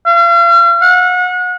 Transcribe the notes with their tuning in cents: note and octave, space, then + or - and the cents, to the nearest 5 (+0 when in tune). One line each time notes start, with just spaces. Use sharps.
F5 -40
F#5 -35